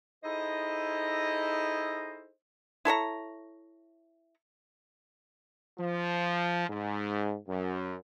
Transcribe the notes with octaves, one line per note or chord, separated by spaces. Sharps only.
D#4 E4 G#4 A4 C5 D#5
E4 A4 C#5 A#5
F3
G#2
F#2